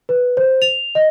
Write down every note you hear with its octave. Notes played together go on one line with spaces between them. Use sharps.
B4
C5
F7
D#5